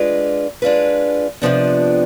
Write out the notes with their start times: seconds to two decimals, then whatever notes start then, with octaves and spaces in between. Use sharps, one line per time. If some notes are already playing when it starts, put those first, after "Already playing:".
Already playing: G#3 D4 F4 B4
0.62 G#3 D4 F4 B4
1.42 F2 C3 F3 B3 D4